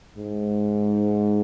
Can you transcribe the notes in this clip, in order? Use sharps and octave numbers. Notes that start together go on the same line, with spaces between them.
G#2